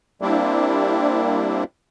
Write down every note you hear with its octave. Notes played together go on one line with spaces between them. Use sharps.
G3 A#3 C4 D4 E4